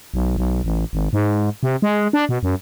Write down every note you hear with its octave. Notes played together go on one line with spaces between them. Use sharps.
B1
B1
A1
G#1
G#2
C3
G#3
D4
B2
F#2